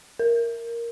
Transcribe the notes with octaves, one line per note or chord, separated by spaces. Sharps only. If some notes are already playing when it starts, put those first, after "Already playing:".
A#4